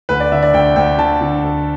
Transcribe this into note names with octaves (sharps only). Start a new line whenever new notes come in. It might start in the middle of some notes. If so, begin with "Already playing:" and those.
D2 B4
D5
D3 E5
D5
D2 G5
D2 G5
D3 A5
D3
D2